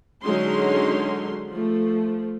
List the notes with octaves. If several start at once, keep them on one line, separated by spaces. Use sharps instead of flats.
D3 F#3 G#3 C#4 D#4 C6
F3 A3